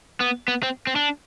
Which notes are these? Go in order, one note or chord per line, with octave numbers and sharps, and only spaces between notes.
B3
B3
C4
C4
D4